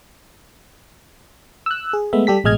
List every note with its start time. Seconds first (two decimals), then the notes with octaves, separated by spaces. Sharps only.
1.66 E6 F#6
1.93 G#4
2.13 G#3 A3 B3 E5
2.27 G3 G4 A4 B6
2.44 A1 B2 G#3 D#5 F6 G#6